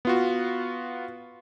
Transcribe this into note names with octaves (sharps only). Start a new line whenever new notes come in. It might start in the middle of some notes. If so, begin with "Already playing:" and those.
B3 F4 F#4